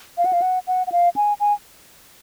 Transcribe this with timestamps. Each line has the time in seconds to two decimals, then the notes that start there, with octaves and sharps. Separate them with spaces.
0.18 F5
0.25 F#5
0.33 F5
0.42 F#5
0.67 F#5
0.87 F#5
0.92 F5
1.16 G#5
1.40 G#5